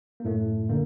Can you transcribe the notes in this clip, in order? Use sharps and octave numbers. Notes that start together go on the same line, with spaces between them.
A#3
F#2 A2 A3
A#2 D3 A#3